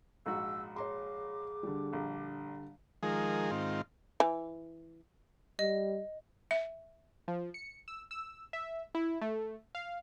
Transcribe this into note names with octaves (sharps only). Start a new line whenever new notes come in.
A#1 G#2 F#4 E6
G#4 C#5 A#5 C6 D6
D3 G3
A#1
D#3 F3 G#3 G#4 A#4
G#2 D#3 C4 F4
E3
G3 D#5
E5
F3
C#7
E6
E6
E5
E4
A3
F5